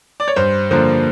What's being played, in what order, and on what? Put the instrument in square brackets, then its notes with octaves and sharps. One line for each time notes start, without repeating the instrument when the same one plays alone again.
[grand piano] D5
C#5
G2 C5
D3 F3 A#3 C5